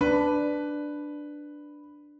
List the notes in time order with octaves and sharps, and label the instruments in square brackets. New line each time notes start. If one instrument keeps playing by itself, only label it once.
[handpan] D4 [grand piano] B4